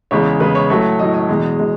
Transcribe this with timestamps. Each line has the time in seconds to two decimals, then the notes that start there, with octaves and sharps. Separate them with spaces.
0.11 E2 C#3 G#3 C#5
0.40 E2 C#3 G#3 B4
0.55 C#5
0.70 A2 F#3 A3 C#5
0.99 A2 F#3 A3 D#5
1.14 D#5
1.29 E2 B2 G#3
1.59 B2 G#3